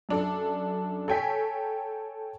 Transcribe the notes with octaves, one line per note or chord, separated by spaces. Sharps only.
F#2 D4 A4
A4 C#5 G5 G#5 B6